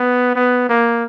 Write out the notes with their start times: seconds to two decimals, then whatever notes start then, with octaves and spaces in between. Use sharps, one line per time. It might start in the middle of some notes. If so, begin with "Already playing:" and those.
Already playing: B3
0.35 B3
0.69 A#3